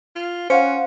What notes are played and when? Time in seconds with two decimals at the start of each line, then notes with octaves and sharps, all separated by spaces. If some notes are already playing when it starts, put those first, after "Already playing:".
0.16 F4
0.50 C#4 C5 F5 F#5